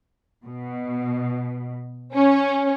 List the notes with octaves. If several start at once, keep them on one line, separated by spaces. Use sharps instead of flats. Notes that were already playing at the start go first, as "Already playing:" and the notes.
B2
C#4